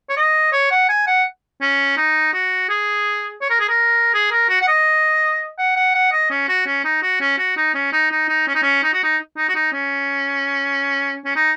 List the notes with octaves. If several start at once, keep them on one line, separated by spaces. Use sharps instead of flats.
C#5
D#5
C#5
F#5
G#5
F#5
C#4
D#4
F#4
G#4
C#5
A#4
G#4
A#4
G#4
A#4
F#4
F#5
D#5
F#5
F#5
F#5
D#5
C#4
F#4
C#4
D#4
F#4
C#4
F#4
D#4
C#4
D#4
D#4
D#4
C#4
D#4
C#4
D#4
F#4
D#4
D#4
F#4
D#4
C#4
C#4
D#4